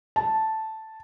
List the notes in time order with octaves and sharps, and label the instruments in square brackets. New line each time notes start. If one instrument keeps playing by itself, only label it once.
[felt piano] A5